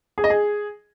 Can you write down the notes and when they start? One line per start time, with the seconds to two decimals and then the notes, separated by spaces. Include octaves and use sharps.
0.18 G#4
0.24 D#5
0.30 G#4